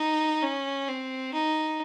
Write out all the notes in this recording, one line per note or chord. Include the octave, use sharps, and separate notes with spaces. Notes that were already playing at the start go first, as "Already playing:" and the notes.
Already playing: D#4
C#4
C4
D#4